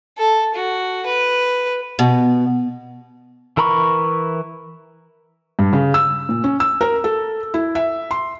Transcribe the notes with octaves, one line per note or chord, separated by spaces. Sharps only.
A4
F#4
B4
B2
E3 A#4 A#5 B5 C#6
G2
C#3
E6
A#2
C#4
E6
A#4
A4
E4
E5
C6